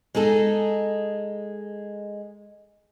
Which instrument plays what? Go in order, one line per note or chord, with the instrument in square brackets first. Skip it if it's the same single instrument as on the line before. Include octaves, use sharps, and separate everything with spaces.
[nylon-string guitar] G#3 D#4 G#4 A4